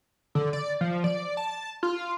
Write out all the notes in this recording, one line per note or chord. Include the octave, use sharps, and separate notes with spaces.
D3
D5
F3
D5
A5
F4